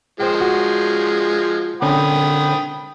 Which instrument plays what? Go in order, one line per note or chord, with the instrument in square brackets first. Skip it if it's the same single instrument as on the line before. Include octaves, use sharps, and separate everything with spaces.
[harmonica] F3 G#3 [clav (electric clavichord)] C5 G5
[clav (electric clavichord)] F#4
[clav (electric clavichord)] D3 C4 C#4 [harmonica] G5 B5 D#6